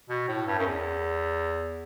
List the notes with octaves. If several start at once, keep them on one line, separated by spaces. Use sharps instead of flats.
B2
A2
G2
F#2
E2